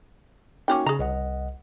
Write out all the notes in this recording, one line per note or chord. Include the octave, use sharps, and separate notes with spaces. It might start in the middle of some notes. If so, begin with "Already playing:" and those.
A#3 C#4 D#4 F#4 G5 C#6
C#3 G#4 A#5
C2 D#5 F#5